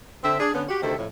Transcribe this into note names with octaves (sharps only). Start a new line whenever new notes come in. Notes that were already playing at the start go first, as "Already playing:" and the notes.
D3 C4 E5
D4 G#4
D3 B3 C#4
F#4 G4
D2 C3 D#3 C4 A4 E5
F2 A2